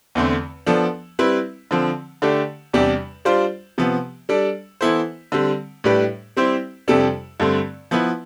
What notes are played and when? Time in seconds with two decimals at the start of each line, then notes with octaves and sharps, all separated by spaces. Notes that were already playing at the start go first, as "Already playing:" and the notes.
0.15 E2 D3 A3 C4
0.66 F3 B3 D4 A4
1.19 G3 C4 E4 B4
1.71 D3 F3 C4
2.22 D3 A3 D4 G4
2.73 E2 C3 G3 D4 G4
3.25 G3 D4 F4 C5
3.78 C3 F3 B3
4.29 G3 D4 A4
4.81 E3 B3 E4 A4 C5
5.32 D3 G3 C4
5.84 A2 G3 D4 G4 B4
6.37 G3 C4 E4 G4 C5
6.88 F2 C3 G3 D4 A4
7.40 G2 D3 A3 C4
7.91 F3 B3 E4 B4